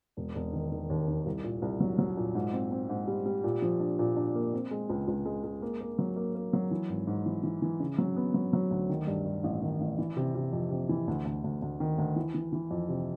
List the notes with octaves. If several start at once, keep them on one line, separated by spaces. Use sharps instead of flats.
E1
E1
D#3
D#3
D#2
D#3
C2
A#2
C2
F#3
F#3
A#2
G#2
C4
C4
G#2
G3
G3
A#2
F3
D4
A#2
D4
A#3
C4
G#3
C#2
C#2
G#3
G#3
A#3
A#3
F#3
A#3
A#3
F#3
E3
G#1
G#2
E3
E3
E3
C#3
F#3
B3
F#3
F#3
D2
D#3
G2
G2
A1
D#3
A1
E3
C3
C3
F2
C3
E3
D2
D2
D2
D2
D#3
D2
E3
E3
E3
F2
C3